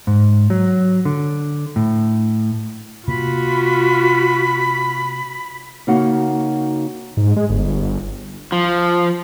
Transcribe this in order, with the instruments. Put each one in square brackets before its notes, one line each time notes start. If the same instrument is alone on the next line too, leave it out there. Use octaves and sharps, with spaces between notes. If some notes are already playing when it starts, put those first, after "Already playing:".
[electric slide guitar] G#2
F#3
D3
A2
[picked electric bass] C3 A#3 [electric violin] F4 F#4 [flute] B5
[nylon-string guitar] C#3 A#3 D#4 F#4 F#5
[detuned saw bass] G#2
G#3
G1
[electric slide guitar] F3